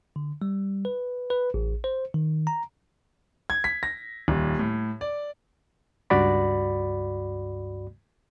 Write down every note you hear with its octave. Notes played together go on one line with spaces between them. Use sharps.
D3
G3
B4
B4
A1
C5
D#3
A#5
G#6
B6
A#6
D#1
A2
D5
C#2 G2 F#4 D5 B5